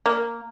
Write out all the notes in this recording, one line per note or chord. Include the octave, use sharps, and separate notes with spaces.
A#3